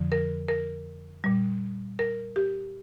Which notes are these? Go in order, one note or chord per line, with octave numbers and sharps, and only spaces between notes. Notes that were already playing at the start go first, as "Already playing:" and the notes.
Already playing: F2 D3 F3
A#4
A#4
A#2 G3
A#4
G4